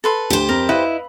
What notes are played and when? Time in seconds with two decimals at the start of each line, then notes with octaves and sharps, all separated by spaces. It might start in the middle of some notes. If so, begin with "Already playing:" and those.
0.04 A4 B4 C6
0.30 D2 G4 C5
0.49 F2 A#4
0.69 E4 B4 D#5 F5 F#6